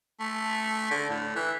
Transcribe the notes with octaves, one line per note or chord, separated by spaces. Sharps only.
A3
D3
A2
E3